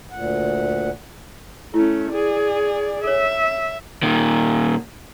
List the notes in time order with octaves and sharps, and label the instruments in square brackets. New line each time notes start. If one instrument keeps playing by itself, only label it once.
[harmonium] D2 A#2 F#5
[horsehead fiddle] A3 C#4 [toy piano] E4
[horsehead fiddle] G#4 D5
[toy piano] A4 C#5 [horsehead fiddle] E5
[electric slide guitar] A#2 D#3